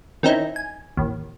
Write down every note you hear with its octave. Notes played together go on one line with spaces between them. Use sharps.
D#3 C4 C#4 D#4 E4
G#5
A1 D#2